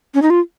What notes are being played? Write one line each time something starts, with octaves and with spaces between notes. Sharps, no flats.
C#4
D#4
F4